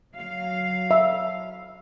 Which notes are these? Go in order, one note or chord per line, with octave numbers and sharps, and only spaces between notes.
F#3 F5
E5